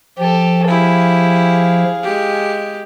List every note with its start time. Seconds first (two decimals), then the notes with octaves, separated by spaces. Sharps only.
0.18 F3 G4 A4
0.67 E4 G4 G#4 F5
2.03 G#3 G4